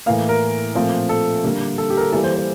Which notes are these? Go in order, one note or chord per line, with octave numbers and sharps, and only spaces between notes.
A2 E3 A#3 F5
A#4
A#2 F3 A3 C4
A4
D3 G3 A#3
A4
G4
A#4
A4
E3 G3 A#3 A4
C5
C5